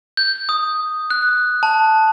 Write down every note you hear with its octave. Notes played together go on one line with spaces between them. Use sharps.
G6
D#6
F#6
A5